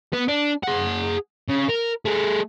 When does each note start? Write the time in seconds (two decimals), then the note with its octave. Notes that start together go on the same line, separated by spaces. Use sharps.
0.13 B3
0.28 D4
0.64 G#4 F#5
1.48 C#3
1.68 A#4
2.05 A3 G#4